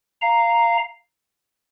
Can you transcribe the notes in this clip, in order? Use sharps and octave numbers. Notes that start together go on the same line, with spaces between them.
F5 A#5